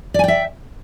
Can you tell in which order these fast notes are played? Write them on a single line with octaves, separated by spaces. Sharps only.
D5 G#5 G5 E5